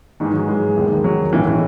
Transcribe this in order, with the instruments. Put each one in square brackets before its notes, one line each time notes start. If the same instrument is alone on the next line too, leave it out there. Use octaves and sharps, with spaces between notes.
[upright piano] G#2 E3 G#3 [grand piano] D#3
[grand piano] F#3
[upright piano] G#2 E3 G#3
E1 D#2 D#3 G#3
[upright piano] E1 D#2 D#3 G#3 [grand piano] F#3
[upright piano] B1 A2 G#3 C#4 [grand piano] E3
[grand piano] E3